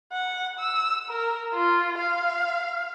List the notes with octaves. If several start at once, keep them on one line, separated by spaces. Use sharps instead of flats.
F#5
E6
A#4
F4
F5